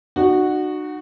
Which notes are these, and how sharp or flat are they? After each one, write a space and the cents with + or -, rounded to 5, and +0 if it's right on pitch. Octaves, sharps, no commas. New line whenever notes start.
D#4 -45 F#4 -5